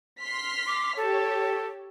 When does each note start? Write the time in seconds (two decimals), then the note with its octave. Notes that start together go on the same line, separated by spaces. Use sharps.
0.22 C6 F6 B6
0.67 D6
0.97 G4 A4 C#5